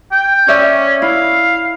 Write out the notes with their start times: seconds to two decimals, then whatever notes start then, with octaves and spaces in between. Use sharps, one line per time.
0.11 G5
0.48 C#4 C#5 D5 E5
1.02 E4 F5